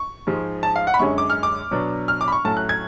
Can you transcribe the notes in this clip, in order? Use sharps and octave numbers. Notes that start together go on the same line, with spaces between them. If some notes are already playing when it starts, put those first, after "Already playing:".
Already playing: C#6
G#2 F3 G#3
A5
F5
F#5
B5
F#2 D3 G#3 C#4 C#6
D6
F6
D6
B2 F#3 B3 D4
F6
D6
B5
C#6
A2 F#3 A3 C#4 A5
F#6
G#6